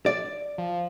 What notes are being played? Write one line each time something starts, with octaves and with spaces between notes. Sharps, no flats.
D5
F3